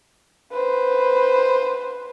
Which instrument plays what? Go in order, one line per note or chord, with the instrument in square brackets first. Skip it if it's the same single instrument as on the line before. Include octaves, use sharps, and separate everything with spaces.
[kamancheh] B4 C5